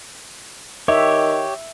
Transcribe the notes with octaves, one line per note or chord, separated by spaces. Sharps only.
D#3 G4 C#5 E5